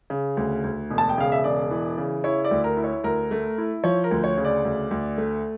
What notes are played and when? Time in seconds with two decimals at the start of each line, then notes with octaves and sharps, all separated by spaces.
0.10 C#3
0.37 D2
0.64 D2
0.90 E1
0.98 A5
1.09 G5
1.18 C#3 F5
1.32 E5
1.44 E1 D5
1.71 E3
1.98 C#3
2.24 E4 C#5
2.44 D5
2.51 D2
2.64 A#4
2.77 E4
2.84 C#5
3.04 D2 A#4
3.31 A3
3.58 E4
3.84 F3 C#5
4.04 A#4
4.11 D2
4.24 C#5
4.37 C#3
4.45 D5
4.65 D2
4.91 D2
5.18 A3